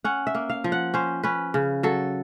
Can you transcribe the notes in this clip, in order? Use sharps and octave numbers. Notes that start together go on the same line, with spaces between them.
C#4 F#5
E5
A#3
F5
F3
F#5
C#4 C5
C#4 B4
C#3
F#3 A4